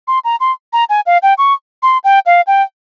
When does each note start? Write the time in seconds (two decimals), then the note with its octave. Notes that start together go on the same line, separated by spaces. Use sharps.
0.08 C6
0.25 A#5
0.40 C6
0.73 A#5
0.89 G#5
1.06 F5
1.23 G5
1.38 C#6
1.83 C6
2.04 G5
2.26 F5
2.47 G5